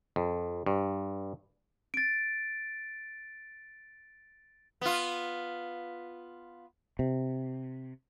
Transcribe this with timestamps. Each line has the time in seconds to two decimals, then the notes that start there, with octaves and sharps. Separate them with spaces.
0.16 F2
0.66 G2
1.94 A6 D7
4.81 B3 F4
6.99 C3